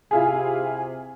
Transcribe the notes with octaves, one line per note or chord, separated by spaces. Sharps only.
C3 E4 F4 G#4 G#5